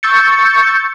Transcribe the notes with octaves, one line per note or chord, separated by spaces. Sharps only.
C#6 E6 G6 A6 C#7